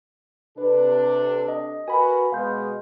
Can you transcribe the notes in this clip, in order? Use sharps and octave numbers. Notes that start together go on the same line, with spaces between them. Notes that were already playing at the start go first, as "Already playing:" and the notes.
C3 D4 A4 B4
D#5
F#4 A#4 B4 G#5 B5
B2 G#3 B3 F5 C6 G6